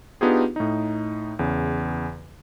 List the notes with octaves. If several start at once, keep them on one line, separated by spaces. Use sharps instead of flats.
B3 D4 D#4 F4 G4 G#4
A2 D#4
E2 C#3